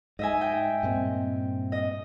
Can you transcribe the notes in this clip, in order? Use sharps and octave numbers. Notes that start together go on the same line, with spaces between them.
G#2 D#5 E5 G#5
G5
G2 A#2 C4
D#5